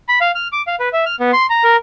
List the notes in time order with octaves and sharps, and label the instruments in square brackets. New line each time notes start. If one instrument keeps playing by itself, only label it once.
[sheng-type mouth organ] B5
F5
F6
D6
F5
B4
E5
F6
B3
C6
A#5
A#4